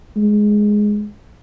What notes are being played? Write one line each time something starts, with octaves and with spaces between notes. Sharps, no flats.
G#3